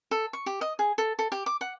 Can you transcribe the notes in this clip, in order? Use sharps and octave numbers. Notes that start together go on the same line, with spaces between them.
A4
C#6
G4
D#5
G#4
A4
A4
G4
D6
F#5